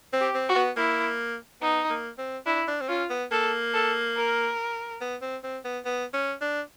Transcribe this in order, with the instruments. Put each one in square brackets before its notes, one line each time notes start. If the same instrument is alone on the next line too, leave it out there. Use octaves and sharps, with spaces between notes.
[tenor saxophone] C4
[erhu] G4
[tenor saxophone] C4
[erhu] F#4
[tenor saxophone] B3
[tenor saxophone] A#3 [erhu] E4
[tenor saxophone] B3 [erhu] D#4
[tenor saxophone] A#3
C4
[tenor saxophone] D4 [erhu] E4
[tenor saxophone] D4
C4
[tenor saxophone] C#4 [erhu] F4
[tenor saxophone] B3
[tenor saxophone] A#3 [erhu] A4
[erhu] A4
A#4
[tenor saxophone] B3
C4
C4
B3
B3
C#4
D4